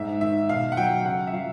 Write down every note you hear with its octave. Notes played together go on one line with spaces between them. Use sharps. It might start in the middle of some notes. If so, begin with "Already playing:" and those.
Already playing: G#2 E5
D#3 E5
B2 F5
F#5
F#3 G5
C#3 F#5
E5
F#3 F5